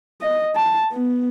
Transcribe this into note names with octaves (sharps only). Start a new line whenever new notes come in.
D#5
A5
B3